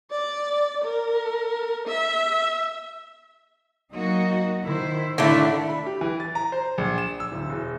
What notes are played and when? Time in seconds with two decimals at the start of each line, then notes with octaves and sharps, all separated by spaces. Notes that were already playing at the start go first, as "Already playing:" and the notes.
0.11 D5
0.84 A#4
1.88 E5
3.93 F#3 A#3 D#4 F#4 D#5
4.63 D#3 E4 C5
5.18 A2 D3 A3 D4 E4
5.69 B5
5.86 G4
6.01 E3
6.20 A6
6.35 A#5
6.52 C5
6.78 A#1
6.98 E7
7.20 E6
7.32 D1
7.49 E1